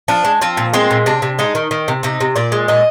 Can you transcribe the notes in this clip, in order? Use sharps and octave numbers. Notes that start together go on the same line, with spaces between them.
F3 D4
G#3
F3 C4
A#2
G#3 C4
A#2
C3 D4
C3
G#3 D#4
D#3
D#3
C3
C3 D#4
C3
A#2 D5
G#3
A#2 D#5